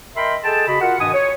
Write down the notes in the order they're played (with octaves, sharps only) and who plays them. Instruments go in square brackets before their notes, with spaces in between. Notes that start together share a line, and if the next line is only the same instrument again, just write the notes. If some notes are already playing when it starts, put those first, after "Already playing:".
[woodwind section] A#4 D#5 E5 G5 B5 C6
G#4 A4 D#5 G5 A5
C#3 F#4 D#5 B5
F4 F#4 A#4 F#5
G2 B2 D#3 D#5 G#5 D#6
C#5